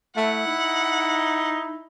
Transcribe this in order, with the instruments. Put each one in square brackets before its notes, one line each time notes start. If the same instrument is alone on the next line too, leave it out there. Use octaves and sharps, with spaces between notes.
[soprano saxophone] A3 [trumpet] E4 [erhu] F#5
[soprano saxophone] D#4